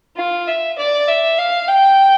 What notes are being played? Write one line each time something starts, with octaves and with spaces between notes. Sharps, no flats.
F4
E5
D5
E5
F5
G5